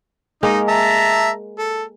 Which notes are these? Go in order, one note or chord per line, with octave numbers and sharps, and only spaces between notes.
G#3 A#3 D#4
E5 A5 A#5
A4